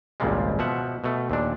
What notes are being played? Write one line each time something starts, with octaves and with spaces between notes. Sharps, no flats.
G#1 C#2 A#2 F3 G3 G#3
B2 F3 E5 F#5
B2 A3
D#2 A#2 D4